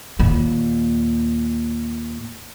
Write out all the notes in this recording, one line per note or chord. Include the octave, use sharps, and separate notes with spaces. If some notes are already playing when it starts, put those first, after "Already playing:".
D#2 A#2